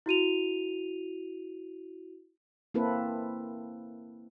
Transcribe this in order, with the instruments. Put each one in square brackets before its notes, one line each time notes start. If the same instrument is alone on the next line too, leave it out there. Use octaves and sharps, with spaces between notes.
[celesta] E4 F#4 D#7 F7
[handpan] A#3 C4 E4 A4 B4